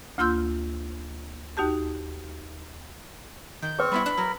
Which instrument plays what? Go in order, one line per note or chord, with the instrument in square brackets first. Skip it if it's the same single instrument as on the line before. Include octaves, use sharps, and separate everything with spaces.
[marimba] D2 A#3 F4 C6 E6 G6
D#2 D#4 F#4 G4 A5
[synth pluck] D#3 [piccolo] G6
[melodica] C4 C#6 [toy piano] G#4 B4
[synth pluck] G3 B3 E4 [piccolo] B5
[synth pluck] D4 F#6 E7
[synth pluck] F#3 [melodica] A#4